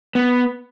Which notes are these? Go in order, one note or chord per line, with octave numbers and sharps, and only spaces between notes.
B3